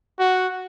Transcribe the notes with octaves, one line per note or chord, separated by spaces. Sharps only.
F#4